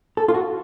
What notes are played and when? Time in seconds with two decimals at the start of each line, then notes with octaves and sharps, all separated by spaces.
0.17 A4
0.28 F4
0.34 F#4